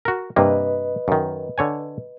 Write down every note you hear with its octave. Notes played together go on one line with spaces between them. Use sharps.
F#4 A#4
G2 C3 A#3 B4 D#5
F#2 D#3
D3 C#5 G#5